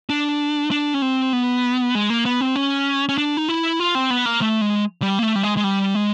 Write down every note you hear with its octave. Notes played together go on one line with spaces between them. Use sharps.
D4
D4
C#4
C4
B3
G#3
A#3
B3
C4
C#4
C#4
D4
D#4
E4
F4
C4
B3
A#3
A3
G#3
G3
A#3
A3
G3
G#3
G#3
G3
G#3